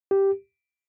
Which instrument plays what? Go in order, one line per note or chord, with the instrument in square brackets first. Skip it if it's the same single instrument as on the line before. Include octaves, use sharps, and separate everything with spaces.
[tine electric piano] G4